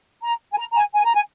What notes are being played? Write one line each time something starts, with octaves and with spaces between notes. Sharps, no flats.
A#5
G#5
A#5
A#5
G#5
G#5
A#5
G#5